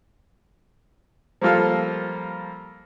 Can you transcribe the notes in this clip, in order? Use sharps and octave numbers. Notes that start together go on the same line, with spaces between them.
F3 G3 A#3 F4 A4 F5